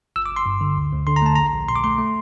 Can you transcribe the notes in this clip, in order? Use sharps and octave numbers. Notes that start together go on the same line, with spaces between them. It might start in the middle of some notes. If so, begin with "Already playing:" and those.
G1 E6
D6
G1
C6
G2
D3
D2
D2
D3 C6
A#5
A3 A5
A#1 A#5
A#1
A#2 C6
D6
A3 C6
A3